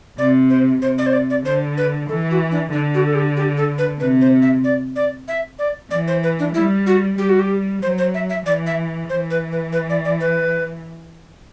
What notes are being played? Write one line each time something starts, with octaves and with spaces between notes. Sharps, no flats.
C3 D5
C5
C3 C5
D5
C5
D5
D5
D3 C5
B4
E3 A4
F#4
D4
D3 D4
F#4
A4
G4
G4
A4
B4
C3 B4
C5
E5
D5
D5
E5
D5
E3 D5
C5
B4
D4
G3 E4
F#4
G3 G4
F#4
G4
F#3 C5
C5
E5
E5
E3 D5
E5
E3 C5
B4
B4
B4
D5
D5
B4